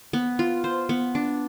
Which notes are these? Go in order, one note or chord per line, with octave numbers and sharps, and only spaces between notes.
B3
F4
C5
B3
D4